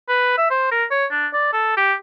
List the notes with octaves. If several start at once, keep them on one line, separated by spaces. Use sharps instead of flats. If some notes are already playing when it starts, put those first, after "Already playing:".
B4
E5
C5
A#4
C#5
D4
D5
A4
G4